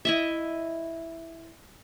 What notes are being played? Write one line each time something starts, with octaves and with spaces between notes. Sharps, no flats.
E4 D#5 E5